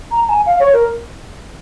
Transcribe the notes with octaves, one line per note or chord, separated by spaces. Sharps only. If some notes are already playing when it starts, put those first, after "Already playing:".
A#5
A#5
G#5
F5
C#5
A#4